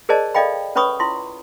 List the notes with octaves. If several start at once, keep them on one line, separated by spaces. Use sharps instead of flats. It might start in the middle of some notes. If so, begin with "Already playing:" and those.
G#4 A#4 C5 D5 D#5 A5
A4 D5 D#5 F5 G5 B5
C#4 B4 C#5 B5 C#6 D#6
E4 F4 C6